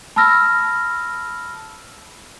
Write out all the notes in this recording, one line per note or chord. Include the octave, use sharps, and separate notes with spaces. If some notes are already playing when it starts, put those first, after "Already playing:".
A5 B5 E6 F6 A#6